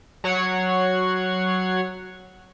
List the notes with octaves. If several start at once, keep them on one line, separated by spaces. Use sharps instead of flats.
F#3 C#5 F#5 G#6 C7